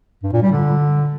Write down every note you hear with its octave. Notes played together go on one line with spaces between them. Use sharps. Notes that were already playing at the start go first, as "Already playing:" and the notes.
G2
A#2
G3
D3